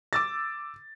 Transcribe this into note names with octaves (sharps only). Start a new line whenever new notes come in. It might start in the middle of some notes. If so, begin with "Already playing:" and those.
D6 E6 A6